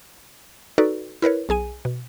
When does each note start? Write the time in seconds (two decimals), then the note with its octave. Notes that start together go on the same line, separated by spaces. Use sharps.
0.78 D#4 F#4 A4 B4 D5
1.22 E4 A#4 B4 C#5
1.49 B1 G#4 G#5 D#7
1.85 B2